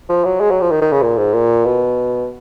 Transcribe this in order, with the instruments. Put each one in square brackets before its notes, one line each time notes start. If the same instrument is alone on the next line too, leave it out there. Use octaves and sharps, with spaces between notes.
[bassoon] F3
F#3
G#3
F#3
F3
D#3
D#3
C#3
A#2
G#2
A#2
B2